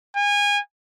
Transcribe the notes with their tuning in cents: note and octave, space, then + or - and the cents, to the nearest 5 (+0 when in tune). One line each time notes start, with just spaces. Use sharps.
G#5 -25